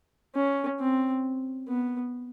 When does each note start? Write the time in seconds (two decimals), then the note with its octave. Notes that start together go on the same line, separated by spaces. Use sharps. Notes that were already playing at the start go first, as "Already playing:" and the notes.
0.36 C#4
0.80 C4
1.68 B3